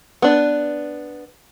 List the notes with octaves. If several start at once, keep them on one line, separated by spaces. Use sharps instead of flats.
B3 D4